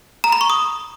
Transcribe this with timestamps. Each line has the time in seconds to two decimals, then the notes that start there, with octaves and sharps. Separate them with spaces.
0.24 A#5
0.32 B5
0.41 C#6
0.50 D#6